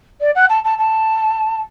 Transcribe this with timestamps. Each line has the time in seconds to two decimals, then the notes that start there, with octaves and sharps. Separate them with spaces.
0.20 D5
0.35 F#5
0.49 A5
0.64 A5
0.78 A5